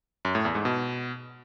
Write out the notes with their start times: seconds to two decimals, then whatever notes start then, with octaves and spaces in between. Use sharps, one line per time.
0.25 F#2
0.35 A2
0.45 E2
0.55 G#2
0.65 B2